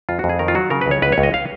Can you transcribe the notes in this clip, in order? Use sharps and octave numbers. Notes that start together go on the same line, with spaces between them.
F2 F4
F#4
F2
G#4
D#3 A#4
F4
F#3 F#4
C#3 A#4
B4
C#2 C#5
C#2 B4
C#5
C#2
D#5
F5